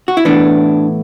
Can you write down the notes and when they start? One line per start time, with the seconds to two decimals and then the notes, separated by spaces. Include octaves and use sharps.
0.08 F#4
0.17 E4
0.25 A2 E3 B3 D4